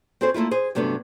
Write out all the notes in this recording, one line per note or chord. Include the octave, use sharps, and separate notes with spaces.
C4 F#4 G#4 A4 C5
A3 A#3 E4 F4
G#4 C5
G2 C3 F#3 A3 B3 D4